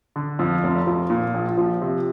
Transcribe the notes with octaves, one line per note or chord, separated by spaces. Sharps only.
D3
F2
F1
F3
A#2
A#1
F3
C3